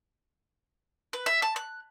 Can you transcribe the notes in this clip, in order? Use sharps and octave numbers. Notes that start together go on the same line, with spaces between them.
B4
E5
A5
F#6